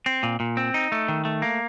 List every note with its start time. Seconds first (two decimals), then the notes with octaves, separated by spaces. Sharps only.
0.06 C4
0.23 A#2
0.40 A#2
0.57 C4
0.74 D#4
0.92 A3
1.08 D#3
1.25 A3
1.42 A#3